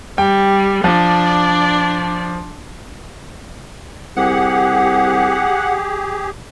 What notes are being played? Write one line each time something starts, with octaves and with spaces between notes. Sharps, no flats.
G3 G5
F3 D4 D5
C2 G4 G#4 F#5